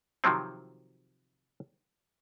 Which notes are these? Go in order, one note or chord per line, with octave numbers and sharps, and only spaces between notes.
C3 D#3 F3 F#3 C4